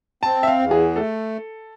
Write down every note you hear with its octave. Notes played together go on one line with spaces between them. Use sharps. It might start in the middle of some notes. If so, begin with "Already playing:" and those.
C4 A5
E5
F5
E2
G#4
A3 A4